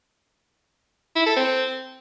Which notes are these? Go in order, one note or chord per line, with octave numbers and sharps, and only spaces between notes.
E4
A4
C4